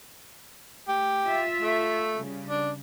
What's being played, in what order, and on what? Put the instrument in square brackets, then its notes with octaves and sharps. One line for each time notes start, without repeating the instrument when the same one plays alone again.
[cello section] A3 [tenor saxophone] G4
[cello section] F4 E5
[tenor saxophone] A3
[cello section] C#3 G3
[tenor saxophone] D4